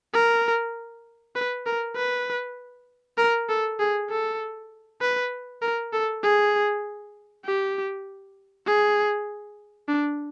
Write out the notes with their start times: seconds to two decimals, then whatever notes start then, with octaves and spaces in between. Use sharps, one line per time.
0.14 A#4
1.35 B4
1.66 A#4
1.96 B4
3.18 A#4
3.49 A4
3.80 G#4
4.10 A4
5.01 B4
5.62 A#4
5.93 A4
6.23 G#4
7.45 G4
8.67 G#4
9.88 D4